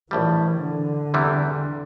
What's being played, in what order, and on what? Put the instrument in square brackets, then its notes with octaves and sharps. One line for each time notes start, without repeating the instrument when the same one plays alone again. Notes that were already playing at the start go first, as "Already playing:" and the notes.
[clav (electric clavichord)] A#1 A2 G3 [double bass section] E3
[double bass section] D3
[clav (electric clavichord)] E2 C3 E3 G3